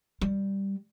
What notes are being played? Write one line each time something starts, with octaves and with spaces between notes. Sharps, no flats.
G3